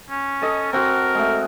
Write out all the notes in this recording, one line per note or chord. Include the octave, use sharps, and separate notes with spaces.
C#4
A4 D#5
C4 F#4 A#4
G#3 A3